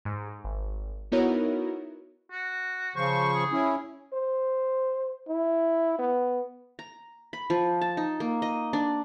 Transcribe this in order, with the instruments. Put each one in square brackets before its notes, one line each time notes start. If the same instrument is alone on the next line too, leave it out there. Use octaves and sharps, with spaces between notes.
[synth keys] G#2
G#1
B3 D#4 E4 F#4 A#4 C#5
[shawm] F#4
[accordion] C#3 F3 C#6 [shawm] C5
[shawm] G#4
[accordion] C#4 E4
[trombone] C5
E4
B3
[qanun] A#5
B5
F3
A5
D#4
A#3
D#5
D4